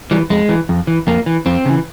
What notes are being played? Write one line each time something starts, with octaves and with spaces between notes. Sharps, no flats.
E3 G3
F2 G#3
E3
F2
E3
F2 A#3
E3
F2 C4
C#3 E3